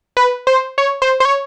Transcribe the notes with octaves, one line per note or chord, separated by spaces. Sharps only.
B4
C5
C#5
C5
C5
C#5